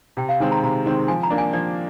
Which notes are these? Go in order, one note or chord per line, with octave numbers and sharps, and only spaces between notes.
C3 G5
F5
D#3 G#3 C4 G#5
A#5
C3 A#5
D#3 G#3 C4
F3 G#5
A#5
A#3 D4
G#5
F3 D5